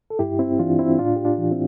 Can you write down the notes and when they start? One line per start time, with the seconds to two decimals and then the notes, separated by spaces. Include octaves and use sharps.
0.10 A4
0.19 G2 E4 G4
0.39 C4 E4
0.59 E3 D4 F4
0.79 C4 E4
0.99 A2 D4 F4
1.16 G4
1.25 D4 F4
1.38 E3
1.51 C4 E4